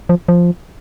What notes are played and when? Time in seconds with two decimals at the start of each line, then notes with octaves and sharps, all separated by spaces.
0.09 F3
0.29 F3